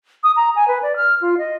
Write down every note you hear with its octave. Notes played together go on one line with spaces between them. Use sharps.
D#6
A#5
G#5
B4
D5
F6
F4
D#5